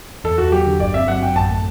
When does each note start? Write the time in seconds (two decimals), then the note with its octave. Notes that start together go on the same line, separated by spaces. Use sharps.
0.24 E2 A4
0.38 E2 F#4
0.52 F#3 G4
0.66 D3
0.80 G1 D5
0.94 C4 E5
1.08 F#3 F#5
1.22 F#2 G5
1.36 A1 A5
1.51 A3